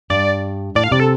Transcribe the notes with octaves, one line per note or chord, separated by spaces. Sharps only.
G2 D5
A2 D5
F5
C3 D5
A4